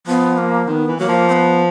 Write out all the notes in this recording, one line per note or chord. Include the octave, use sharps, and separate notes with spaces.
F3 B3
A#3
D#3 B3 C4
E3
F#3 A#3
F3
C4
B3